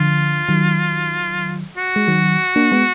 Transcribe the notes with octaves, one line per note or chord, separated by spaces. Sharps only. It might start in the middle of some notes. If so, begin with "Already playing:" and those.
Already playing: D3 F3 F4
D#3 F#3
F#4
G#3
D#3 F#3
A#3 D4
G#3 B3